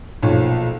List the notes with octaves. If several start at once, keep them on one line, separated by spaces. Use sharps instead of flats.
B1 A#2 F3 C#5